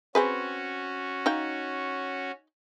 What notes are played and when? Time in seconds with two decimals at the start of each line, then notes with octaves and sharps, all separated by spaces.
0.15 C4 C#4 F#4 G#4 B4
1.26 D#4 F5 G5